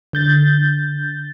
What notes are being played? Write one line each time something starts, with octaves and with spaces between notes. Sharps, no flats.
D3 G6 A6